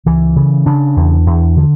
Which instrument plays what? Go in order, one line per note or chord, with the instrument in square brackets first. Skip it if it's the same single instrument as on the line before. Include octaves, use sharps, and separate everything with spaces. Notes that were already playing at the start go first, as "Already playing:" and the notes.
[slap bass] C#2 E3
C#3
C#3 D4
E2
E2
D3